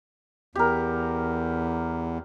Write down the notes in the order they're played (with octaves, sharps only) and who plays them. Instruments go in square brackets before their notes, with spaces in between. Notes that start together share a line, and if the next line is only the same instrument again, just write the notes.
[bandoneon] E2 [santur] G4 A#4